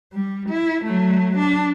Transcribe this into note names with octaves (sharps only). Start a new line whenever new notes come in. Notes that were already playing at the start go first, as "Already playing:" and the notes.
G3
E4
F#3 A3
D4